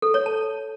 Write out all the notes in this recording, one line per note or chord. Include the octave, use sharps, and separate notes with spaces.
A4
C#5
A5